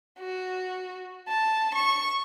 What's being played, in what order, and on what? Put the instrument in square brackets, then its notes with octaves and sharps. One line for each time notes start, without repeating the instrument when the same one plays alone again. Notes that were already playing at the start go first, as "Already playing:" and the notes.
[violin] F#4
A5
C#6